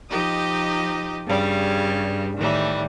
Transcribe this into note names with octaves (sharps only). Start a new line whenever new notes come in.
F3 D#4 G4 D#5
G2 C#3 G3
A2 D#3 E3 G3 A3